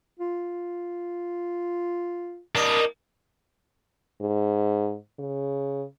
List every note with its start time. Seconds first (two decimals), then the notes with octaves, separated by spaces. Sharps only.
0.19 F4
2.55 G3 A#3 D4 D#5
4.22 G#2
5.19 C#3